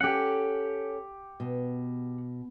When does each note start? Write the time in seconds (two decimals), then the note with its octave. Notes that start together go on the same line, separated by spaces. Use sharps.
0.01 C#4 G4 A4 F#5
1.40 B2